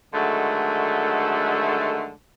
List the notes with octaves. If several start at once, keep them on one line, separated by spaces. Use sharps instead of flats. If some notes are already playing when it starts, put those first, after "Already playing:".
D3 D#3 F#3 G#3 A3